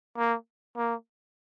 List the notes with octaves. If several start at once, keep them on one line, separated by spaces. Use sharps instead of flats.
A#3
A#3